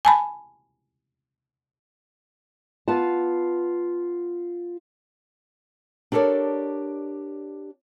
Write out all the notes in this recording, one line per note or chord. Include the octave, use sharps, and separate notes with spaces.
G#5 A5 B5
B3 F4 B4 A5
D4 G4 A4 A#4 C#5 D5